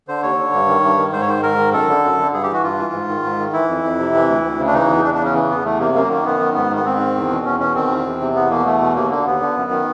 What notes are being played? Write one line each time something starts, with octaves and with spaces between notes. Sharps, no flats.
D3 C5
D#2 C#5
D3
G2
D#3
G2
D#3
G#2 C5
C#5
D#3 C5
G#2 A#4
D#3
F#2 A4
D3
F#2
D3
G2 G#4
G4
E3
F#4
G2 F4
E3
G#2
D#3
G#2
D#3
E3 E4
F2
F2
C3
E3
D2
D2
C#3
D4
E3 D#4
E2
E2 D4
D4
C#3
C#4
E3
E2 B3
E2 A3
C3 A#3
F#2 A#3
D#3 A#3
F#2 B3
D#3
G#2 B3
D#3
B3
G#2 C4
D#3
E2
B2
E2 C#4
B2 C#4
D#3 C4
E2
E2
C3
E2 B3
B2 A#3
E2 A3
B2
D#2 A#3
D3 A#3
D#2 B3
D3
F#2
D#3